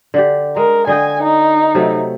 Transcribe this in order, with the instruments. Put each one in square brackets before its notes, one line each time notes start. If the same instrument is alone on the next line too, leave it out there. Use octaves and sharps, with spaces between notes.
[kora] D3 D4 G4
[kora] G#3 [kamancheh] A#4
[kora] D3 D#5 G5 [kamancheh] G#5
[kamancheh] D#4
[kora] C3 F#3 A3